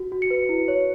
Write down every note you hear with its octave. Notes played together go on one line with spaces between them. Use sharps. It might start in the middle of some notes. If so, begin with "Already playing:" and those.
Already playing: F#4
F#4
C#7
B4
E4
C#5